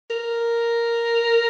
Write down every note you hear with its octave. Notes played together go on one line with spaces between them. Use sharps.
A#4